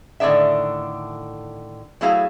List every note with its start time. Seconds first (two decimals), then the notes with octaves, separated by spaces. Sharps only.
0.20 A2 D3 D#3 D4 E5
2.01 F#3 A3 B3 E4 G#4 F5